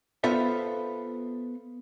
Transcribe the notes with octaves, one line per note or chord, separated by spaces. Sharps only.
B3 F4 A4 C5 E5